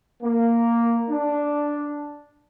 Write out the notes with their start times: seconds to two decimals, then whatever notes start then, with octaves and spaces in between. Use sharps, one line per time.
0.22 A#3
1.09 D4